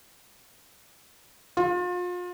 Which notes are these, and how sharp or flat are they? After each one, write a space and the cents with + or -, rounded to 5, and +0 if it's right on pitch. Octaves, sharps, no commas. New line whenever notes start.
F4 +35